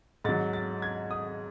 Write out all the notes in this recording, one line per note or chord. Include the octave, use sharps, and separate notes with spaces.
G#2 F#3 A6
A6
G#6
D#6